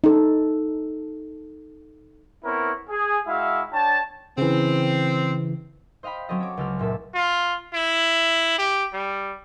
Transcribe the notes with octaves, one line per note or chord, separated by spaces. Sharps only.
D#4 A4
B3 C4 E4 A#4 C#5
G#4
G#3 E4 F#4 E5 F5
D4 C#5 G5 A5
C#3 E3 C4
C5 D#5 F5 G5 B5
F#3 C4 C#4 A4 D#5
C#5 D6
C#2 A4 F6
F#1 A#2 E5 A5
F4
E4
G4
G3